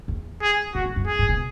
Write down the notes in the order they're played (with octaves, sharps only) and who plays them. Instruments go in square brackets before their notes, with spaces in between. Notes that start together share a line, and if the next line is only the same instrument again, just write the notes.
[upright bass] E2
[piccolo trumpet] G#4
[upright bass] A2 [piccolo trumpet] F#4
[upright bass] G#2
F#2
[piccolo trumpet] G#4
[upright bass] G#2
B2